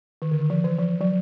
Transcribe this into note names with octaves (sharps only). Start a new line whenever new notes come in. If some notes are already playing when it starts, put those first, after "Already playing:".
D#3
D3
D#3
F3
E3
F3
F#3